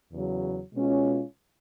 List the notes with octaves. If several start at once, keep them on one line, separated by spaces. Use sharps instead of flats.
E2 C#3 F#3
B2 G#3 C#4 F4